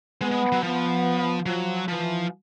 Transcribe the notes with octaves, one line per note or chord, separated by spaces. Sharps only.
G#3 B3
G#3
F#3
F3 B3
F3 F#3
E3 F3